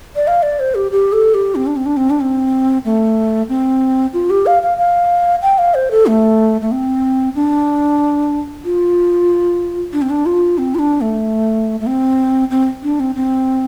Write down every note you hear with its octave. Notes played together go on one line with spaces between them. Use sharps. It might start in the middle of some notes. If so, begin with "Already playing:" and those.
D5
F5
D5
C5
G4
G4
A4
G4
C4
D4
C4
D4
C4
D4
C4
A3
C4
F4
G4
F5
F5
F5
G5
F5
C5
A4
A3
A3
C4
D4
F4
D4
C4
D4
F4
C4
F4
D4
A3
A3
C4
C4
D4
C4
C4